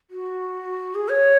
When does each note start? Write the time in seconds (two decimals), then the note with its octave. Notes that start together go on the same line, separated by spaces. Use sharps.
0.10 F#4
0.94 G#4
1.08 C#5